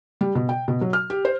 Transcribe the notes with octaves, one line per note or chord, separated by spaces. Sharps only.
G3
B2
G5
B2
F#3
F6
G4
C5